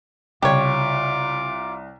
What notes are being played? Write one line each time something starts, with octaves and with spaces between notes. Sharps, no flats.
C2 C#3 F4 G4 C#5 D6